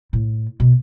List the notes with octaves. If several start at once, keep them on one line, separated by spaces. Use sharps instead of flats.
A2
B2